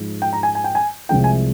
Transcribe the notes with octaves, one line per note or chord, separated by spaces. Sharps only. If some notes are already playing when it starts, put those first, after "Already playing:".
Already playing: G#2 F3 G#3
G5
A#5
G#5
G#5
G5
G#5
C2 C3 F3 G#3 G5
G#5